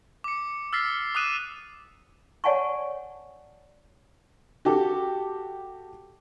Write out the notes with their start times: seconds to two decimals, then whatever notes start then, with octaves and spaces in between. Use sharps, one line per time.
0.24 D6 C#7
0.73 E6 F6 A6 B6 C7
1.15 D6 D#6 F#6 D#7 E7
2.44 C#5 D5 F#5 G#5 A5 C#6
4.65 F#4 G4 A4